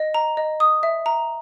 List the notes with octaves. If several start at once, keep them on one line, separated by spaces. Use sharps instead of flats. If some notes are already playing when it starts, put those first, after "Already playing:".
Already playing: D#5
A#5
D#5
D#6
E5
A#5